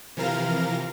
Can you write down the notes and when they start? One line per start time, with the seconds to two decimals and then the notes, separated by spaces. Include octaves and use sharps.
0.17 C3 E3 F3 A#4 F5 A#6